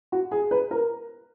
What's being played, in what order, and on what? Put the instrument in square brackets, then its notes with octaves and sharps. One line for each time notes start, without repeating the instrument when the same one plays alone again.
[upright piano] F#4
G#4
B4
A#4